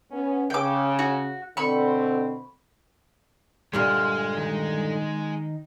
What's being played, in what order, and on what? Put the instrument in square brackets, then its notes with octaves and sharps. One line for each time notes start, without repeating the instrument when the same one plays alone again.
[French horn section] B3 C#4
[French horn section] C#3 [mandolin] G5 D6
[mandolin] F#4
[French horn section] B2 D3 C4 [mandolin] B5 C#6
[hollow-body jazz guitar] G2 A#2 D3 [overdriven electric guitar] G#3 [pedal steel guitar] C5 C6 F6
[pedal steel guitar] D#3 D#4